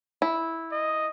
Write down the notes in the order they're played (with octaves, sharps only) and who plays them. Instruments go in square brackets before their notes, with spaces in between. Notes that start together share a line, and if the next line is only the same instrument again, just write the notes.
[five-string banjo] E4
[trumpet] D#5